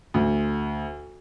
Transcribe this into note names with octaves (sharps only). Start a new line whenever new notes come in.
D2